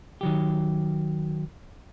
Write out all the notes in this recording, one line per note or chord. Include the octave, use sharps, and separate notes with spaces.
D#3 F#3 G4